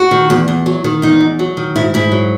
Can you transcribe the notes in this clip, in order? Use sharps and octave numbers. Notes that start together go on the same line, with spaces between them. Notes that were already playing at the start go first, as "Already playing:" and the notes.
Already playing: F#4
D#3
E2
E2
F#3
D#3
E2 D#4
E2
F#3
D#3
G#2 E4
G#2 E4
F#3